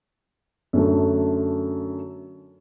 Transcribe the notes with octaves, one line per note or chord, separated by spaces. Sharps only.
F#2 D3 A3